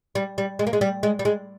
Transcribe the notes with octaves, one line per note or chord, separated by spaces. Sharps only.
G3
G3
G#3
A#3
G#3
G3
G#3
G3
G#3